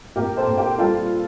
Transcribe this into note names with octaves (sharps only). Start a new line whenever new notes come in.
A#1 G4 A#4
A4 C5
A#1
G4 A#4
G3 F4 A4